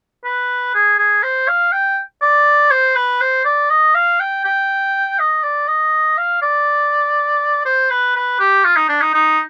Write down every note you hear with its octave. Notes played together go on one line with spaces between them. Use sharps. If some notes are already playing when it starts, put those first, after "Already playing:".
B4
G#4
G#4
C5
F5
G5
D5
C5
B4
C5
D5
D#5
F5
G5
G5
D#5
D5
D#5
F5
D5
C5
B4
B4
G4
F4
D#4
D4
D#4
D#4